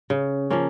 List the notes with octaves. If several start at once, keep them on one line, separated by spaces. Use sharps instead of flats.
C#3
F3 A#3 C#4